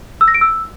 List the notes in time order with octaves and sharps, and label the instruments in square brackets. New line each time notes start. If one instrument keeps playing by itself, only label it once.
[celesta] E6
A#6
D7
E6